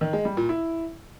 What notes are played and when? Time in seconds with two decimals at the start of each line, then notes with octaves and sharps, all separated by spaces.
0.01 D#3
0.13 G#3
0.25 G3
0.37 A#2
0.49 E4